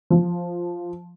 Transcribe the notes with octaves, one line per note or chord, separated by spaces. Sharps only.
F3